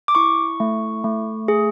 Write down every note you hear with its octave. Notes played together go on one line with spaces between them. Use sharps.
D6
E4 C#6
A3
A3
G#4